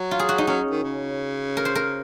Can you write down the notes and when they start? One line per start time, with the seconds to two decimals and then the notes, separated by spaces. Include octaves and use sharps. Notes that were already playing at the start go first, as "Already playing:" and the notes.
Already playing: F#3
0.11 F4
0.19 G#4
0.29 F#4
0.38 D#4
0.47 F#3 C#4
0.71 D#3
0.84 C#3
1.57 A#4
1.65 C5
1.75 A#4